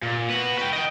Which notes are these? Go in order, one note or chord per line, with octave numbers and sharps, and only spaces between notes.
A#2
F#4 B4
B4 G5
D#5 G5